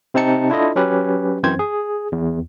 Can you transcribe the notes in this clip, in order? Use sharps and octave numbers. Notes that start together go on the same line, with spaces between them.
C3 C4 D#4 A5 C#7
D4 E4 F4 A4 D#5
F#3 C#4 G4 B4
F#2 E3 C4 C5 G#6
G#4
E2